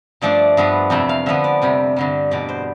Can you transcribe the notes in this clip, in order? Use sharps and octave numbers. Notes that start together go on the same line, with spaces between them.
G2 F3 A3 D4 D5
G2 F3 B3 D4
F2 C3 E3 A3 E5
F5
D3 F3 B3 E5
D5
F2 C3 G3
G2 D3 G3
E2 B2 G3 D5
C5